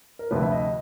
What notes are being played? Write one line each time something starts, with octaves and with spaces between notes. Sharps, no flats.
A#4
D2 C3 F3 B4
E5
D#5